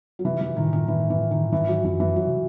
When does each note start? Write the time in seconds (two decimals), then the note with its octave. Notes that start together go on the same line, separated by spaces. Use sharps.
0.19 F#3
0.25 C3 E3
0.41 E3
0.56 A2 D#3
0.73 D#3
0.88 E3
1.10 E3
1.31 D#3
1.52 G#2 E3
1.68 F#3
1.84 F#2 E3
2.00 E3
2.16 F#3
2.27 C3